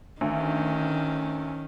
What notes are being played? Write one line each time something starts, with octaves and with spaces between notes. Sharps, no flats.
D2 D#3 C#4